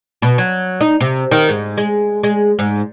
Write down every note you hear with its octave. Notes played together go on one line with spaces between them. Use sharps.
B2
F#3
D#4
C3
D#3
G#2
G#3
G#3
G#2